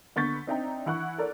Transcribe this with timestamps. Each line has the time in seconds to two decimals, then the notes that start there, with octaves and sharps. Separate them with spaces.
0.16 D3 B3 C#6 G6 A6 B6
0.47 C4 D4 D#4 E5 G5 A#5
0.86 E3 E4 F#5 C#6 F#6
1.18 A4 A#4 D5